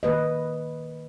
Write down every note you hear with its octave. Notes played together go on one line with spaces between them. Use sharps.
D#3 A#3 B4 D#5